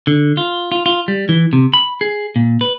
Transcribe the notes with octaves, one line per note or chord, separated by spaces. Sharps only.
D3
F4
F4
F4
G3
E3
C3
B5
G#4
A#2
B4